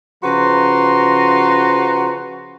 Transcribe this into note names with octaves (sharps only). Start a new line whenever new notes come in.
C#3 F3 F#4 B4 A#5 C6